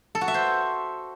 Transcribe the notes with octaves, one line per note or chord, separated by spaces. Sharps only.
A4
F#4
E5
C5